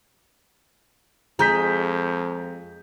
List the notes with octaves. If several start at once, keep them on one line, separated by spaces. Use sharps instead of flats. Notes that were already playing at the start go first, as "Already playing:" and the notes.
F2 G#3 A#5 G6 B6